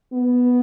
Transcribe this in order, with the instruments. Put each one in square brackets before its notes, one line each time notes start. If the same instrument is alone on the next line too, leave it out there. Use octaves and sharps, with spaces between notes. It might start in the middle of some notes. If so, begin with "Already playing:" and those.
[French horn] B3